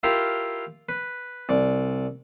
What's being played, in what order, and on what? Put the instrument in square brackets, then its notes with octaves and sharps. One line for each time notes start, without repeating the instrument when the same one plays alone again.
[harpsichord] E4 F4 G4 A#4
B4
C2 D5